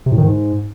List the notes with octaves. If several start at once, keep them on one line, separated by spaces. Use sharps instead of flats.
C3
A2
D#3
G#2